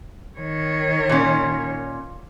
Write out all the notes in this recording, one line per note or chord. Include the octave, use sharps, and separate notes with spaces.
D#3 C#5
A#2 C#4